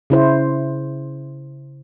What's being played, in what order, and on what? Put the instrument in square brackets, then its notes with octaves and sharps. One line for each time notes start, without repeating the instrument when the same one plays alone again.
[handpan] C#3 E4 C5